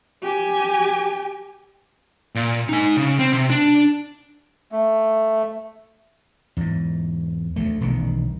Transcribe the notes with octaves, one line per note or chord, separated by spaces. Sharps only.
G4 G#5
A#2
D#4 G#5
C#3
C4
C3
D4
A3
E2 G#2
D2 F#3 A3
E1 B1 A#2 D#3